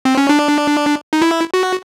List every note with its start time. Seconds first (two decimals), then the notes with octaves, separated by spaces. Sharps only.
0.05 C4
0.17 C#4
0.29 D4
1.13 D#4
1.22 E4
1.54 F#4